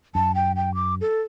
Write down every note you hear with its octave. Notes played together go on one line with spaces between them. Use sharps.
F#2 A5
G5
G5
D6
A4